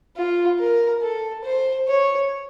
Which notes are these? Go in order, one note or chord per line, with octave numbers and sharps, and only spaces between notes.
F4
A#4
A4
C5
C#5